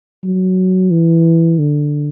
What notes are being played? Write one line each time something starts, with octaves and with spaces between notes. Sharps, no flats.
F#3
E3
D3